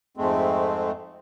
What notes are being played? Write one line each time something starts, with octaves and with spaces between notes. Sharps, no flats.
F2 G#2 G#3 A3 C4